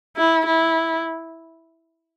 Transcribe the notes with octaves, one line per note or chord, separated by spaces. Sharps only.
E4
E4